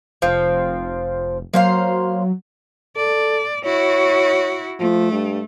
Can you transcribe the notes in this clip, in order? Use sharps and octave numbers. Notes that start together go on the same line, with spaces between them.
F1 F3 C4
F#3 A#3 C5 F5
A4 D5
E4 F#4 C#5
F3 A3
G2